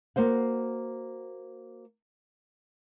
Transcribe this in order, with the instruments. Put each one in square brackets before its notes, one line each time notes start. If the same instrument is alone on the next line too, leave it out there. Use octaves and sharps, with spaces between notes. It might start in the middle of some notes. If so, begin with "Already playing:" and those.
[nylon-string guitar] A#3 F#4 C5 F#5